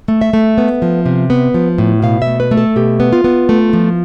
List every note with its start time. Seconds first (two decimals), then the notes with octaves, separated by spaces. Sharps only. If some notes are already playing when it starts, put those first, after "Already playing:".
0.08 A3
0.21 E5
0.33 A3
0.58 B3
0.82 F3
1.06 C3
1.30 B3
1.54 F3
1.78 A2
2.02 B2 F5
2.22 A3 E5
2.40 B4
2.51 A3
2.57 A4
2.76 B2 G4
3.00 B3
3.13 F4
3.24 B3
3.49 A3
3.73 F3